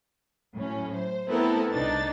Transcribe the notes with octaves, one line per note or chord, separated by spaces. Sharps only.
A2 F#3 C#4
C5
A3 B3 C4 E4 A4 A#4
C2 D4 D#4 A6